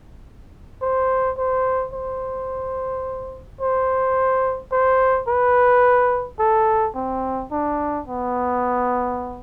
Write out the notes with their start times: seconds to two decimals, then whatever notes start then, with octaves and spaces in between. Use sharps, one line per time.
0.82 C5
1.38 C5
1.93 C5
3.61 C5
4.72 C5
5.28 B4
6.39 A4
6.95 C4
7.51 D4
8.07 B3